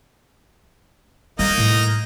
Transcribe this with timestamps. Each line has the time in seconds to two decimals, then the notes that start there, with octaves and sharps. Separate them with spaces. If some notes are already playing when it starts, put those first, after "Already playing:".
1.39 G3 A#3 D#4 D#5
1.58 A2